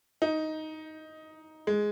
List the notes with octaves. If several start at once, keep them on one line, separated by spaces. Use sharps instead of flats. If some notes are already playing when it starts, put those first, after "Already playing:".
D#4
G#3